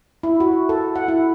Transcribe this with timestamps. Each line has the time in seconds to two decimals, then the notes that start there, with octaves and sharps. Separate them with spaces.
0.23 E4
0.40 F#4
0.69 A4
0.96 F#5
1.08 E4